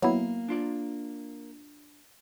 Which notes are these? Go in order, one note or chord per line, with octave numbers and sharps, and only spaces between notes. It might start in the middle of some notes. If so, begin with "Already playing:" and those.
F#3 A#3 B3 E4
D4 F4 D5